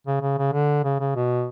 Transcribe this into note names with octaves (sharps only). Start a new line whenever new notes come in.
C#3
C#3
C#3
D3
C#3
C#3
B2